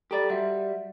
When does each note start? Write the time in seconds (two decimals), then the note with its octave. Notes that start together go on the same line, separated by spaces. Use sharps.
0.11 G4 A4 D5 A#5 A6
0.30 G3 F#4 E5 F#5